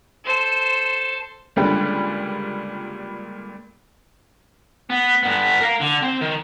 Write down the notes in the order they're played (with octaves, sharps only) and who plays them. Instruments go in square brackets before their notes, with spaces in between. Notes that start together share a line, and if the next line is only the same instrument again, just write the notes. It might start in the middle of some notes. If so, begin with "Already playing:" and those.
[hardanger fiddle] A4 C5
[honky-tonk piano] C#2 A#2 D3 G3 B4 G5
[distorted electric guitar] B3
G2 B3
A#4 F5
D3
C4 C5
D#3